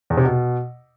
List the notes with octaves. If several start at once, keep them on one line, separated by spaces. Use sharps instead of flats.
E2
C3
B2